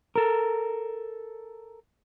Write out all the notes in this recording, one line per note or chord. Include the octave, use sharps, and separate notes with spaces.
A4 A#4